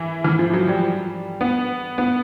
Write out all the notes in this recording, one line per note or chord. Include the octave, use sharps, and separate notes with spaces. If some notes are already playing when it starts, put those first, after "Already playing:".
Already playing: E3
E3
F3
F#3
G3
B3
B3